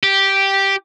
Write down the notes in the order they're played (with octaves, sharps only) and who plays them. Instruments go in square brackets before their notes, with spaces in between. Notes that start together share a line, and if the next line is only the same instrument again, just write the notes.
[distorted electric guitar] G4